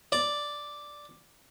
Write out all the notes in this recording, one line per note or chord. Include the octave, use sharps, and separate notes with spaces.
D5